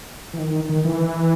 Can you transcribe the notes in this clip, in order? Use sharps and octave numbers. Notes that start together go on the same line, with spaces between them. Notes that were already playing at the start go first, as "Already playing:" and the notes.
E3
D#3
D#3
E3